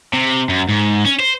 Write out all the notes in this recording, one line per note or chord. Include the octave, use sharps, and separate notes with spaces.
C3
F#2
G#2
C#4
C5